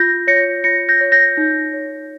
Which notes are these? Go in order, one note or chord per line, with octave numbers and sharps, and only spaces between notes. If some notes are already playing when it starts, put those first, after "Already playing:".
Already playing: F4 G6 A#6
C#5 A#6 C#7
F4 A#6 C#7
G6 A#6
C#5
G6 A#6
D#4
C#5